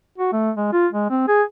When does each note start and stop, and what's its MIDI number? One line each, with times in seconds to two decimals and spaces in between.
0.18 0.32 66
0.33 0.51 57
0.57 0.68 56
0.73 0.87 65
0.93 1.09 56
1.10 1.26 60
1.28 1.43 68